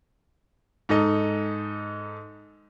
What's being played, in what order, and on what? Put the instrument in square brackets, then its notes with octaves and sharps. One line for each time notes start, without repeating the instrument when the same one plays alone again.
[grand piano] G#2 D#4 A4 D#5